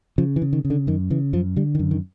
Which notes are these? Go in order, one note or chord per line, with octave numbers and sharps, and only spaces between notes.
C#3 F3
E3
C#3
D#3
C#3
D3
F#2 D#3
C#3 E3
F#2 F3
D3 G3
D#3
F#2
D#3